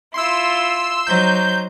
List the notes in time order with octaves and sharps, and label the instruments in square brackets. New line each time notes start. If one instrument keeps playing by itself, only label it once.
[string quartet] E4 F4 [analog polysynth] C6 E6
[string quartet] F#3 D#4 C5 [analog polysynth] G6